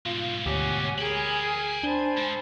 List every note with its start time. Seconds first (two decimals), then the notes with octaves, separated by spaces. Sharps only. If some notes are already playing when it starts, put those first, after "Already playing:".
0.06 G#2 B2 F4
0.46 D2 G4 C#5 F#5 G#5
0.98 G#4 A#4 G5 G#5 B5
1.83 D4 C5 A5 B5
2.17 G#2